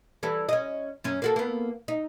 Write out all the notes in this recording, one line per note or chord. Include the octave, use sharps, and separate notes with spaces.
E3 G3 A4
C#4 D#5
F#2 C#4
A#3 F#4 A4
A#3 B3
D#4